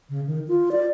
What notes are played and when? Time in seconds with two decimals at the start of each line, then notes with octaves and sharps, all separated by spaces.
0.10 C#3
0.27 D#3
0.48 F4
0.72 D5